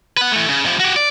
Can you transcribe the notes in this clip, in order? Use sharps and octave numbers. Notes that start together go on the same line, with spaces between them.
B4 F#5
E3 A3
C#3
C3 F3
F#4 G4
D5